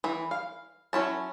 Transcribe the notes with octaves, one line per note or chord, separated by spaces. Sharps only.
E3 E4
F5
F#3 C#4 E4 A5